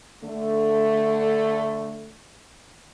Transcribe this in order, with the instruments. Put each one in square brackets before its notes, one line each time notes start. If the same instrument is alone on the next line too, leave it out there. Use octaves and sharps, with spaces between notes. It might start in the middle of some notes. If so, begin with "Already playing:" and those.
[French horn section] D3 A3